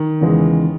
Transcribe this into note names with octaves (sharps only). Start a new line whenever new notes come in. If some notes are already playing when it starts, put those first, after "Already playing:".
Already playing: D#3
E2 C#3 E3 G#3